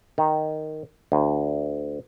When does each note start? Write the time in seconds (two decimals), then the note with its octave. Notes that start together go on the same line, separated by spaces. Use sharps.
0.18 D#3
1.12 D2